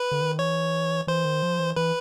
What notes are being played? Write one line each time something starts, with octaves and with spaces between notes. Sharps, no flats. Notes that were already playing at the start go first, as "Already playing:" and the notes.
Already playing: B4
D3
D#3
E3 C#5
E3 C5
D#3
F3
E3
E3 B4